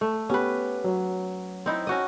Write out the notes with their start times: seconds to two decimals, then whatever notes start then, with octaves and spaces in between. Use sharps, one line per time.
0.01 A3
0.30 B3 C#4 G4 B4
0.84 F#3
1.66 C4 D#4 E4
1.87 C#4 F#4 D#5